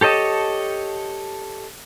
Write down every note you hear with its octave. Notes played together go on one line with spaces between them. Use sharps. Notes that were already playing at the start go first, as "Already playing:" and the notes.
G4 A4 C#5 D#5 A5